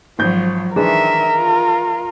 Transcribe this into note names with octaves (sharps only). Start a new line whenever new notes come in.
G#1 F3 F#3 G6
D#3 E3 G#3 D4 A#4 E5
F4